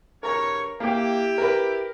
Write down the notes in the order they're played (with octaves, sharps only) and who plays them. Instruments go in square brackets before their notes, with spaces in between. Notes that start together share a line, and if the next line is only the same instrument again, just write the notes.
[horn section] G2 C#3 C#5 [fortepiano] A#4 A#5
[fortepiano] A#3 G5 [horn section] E4 G4
[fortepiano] A#4 B4